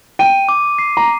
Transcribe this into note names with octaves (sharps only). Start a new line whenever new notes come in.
G5 D#7
D6
C7
A#5